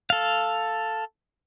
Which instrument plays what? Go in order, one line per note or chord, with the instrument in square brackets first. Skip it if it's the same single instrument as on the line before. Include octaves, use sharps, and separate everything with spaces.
[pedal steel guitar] A4 F5